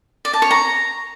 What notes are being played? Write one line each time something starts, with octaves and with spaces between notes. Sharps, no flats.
D5
A5
C#5
A#5